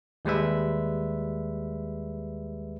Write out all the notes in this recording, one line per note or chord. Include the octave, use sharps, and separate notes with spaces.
D#2 G3 G#3 B4 E5